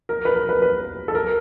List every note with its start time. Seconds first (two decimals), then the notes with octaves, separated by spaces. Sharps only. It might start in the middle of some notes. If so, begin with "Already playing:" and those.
0.09 A#4
0.25 B4
0.36 A#4
0.49 B4
0.62 B4
1.08 A4
1.15 A#4